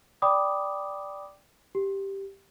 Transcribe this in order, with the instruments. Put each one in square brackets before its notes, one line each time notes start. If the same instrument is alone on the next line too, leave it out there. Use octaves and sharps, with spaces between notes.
[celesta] D5 G5 B5 D6 D#6
G4